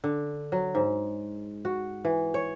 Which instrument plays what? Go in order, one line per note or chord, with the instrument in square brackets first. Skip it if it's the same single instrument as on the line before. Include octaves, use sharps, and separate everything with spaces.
[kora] D3
F#3
G#2
F#4
E3
C#5